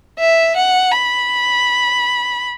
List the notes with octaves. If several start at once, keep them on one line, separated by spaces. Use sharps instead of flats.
E5
F#5
B5